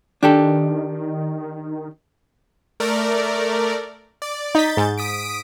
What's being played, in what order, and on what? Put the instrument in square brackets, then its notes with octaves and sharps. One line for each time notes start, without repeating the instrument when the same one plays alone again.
[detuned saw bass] D#3 [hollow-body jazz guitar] D4 G4 A4
[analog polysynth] A3 A#4 D5
D5
[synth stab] D#4 B6 [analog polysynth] G6 A6
[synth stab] G#2
[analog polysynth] D#6 B6 D7